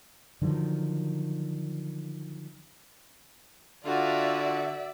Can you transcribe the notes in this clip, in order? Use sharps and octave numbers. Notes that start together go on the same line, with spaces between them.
D3 D#3 F3 F#3
D3 F4 F#4 D5 E5